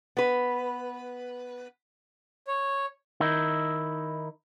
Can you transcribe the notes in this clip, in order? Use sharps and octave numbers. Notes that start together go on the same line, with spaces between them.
B3 B4
C#5
D#3 D#4 E4